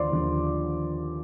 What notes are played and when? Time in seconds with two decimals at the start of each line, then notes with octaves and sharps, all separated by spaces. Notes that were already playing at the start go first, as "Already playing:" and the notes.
Already playing: D#2 D3 F3 F4 C5 D5 C6 D6
0.11 D#2 D3 F3